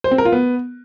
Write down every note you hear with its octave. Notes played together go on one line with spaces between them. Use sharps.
C5
C4
A#4
F4
B3